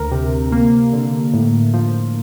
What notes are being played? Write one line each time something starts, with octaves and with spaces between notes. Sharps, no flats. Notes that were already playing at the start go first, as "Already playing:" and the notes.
Already playing: D2 A#4
C3
A#3
D3
A2
F3